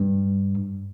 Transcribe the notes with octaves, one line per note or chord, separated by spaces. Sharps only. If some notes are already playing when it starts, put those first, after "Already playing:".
Already playing: G2